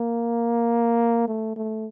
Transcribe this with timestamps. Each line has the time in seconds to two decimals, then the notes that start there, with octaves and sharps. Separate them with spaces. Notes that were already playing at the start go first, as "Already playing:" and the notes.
Already playing: A#3
1.28 A3
1.56 A3